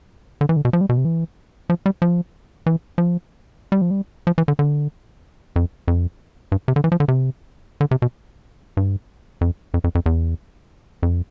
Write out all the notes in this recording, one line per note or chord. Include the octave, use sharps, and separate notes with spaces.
D3
E3
D3
B2
F3
G3
B2
C3
E3
F3
G3
F3
E3
F3
G3
F3
G3
F3
E3
D3
D3
F2
F2
G2
C3
D3
E3
F3
D3
C3
D3
C3
B2
G2
F2
F2
F2
F2
E2
F2